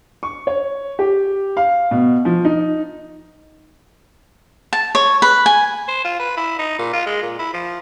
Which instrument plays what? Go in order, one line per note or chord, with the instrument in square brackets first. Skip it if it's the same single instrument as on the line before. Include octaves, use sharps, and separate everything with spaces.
[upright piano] C#6
C#5
G4
F5
B2
F3
D#4
[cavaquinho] A5
C#5
B4
G#5
[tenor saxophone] C5
F4
B4
E4
D#4
A#2
F4
G#3
A#2
E4
F3